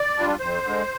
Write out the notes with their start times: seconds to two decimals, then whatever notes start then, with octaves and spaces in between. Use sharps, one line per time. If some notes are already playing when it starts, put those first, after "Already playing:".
Already playing: D5
0.16 G3 D4 F4
0.40 F2 C5
0.63 D3 G#3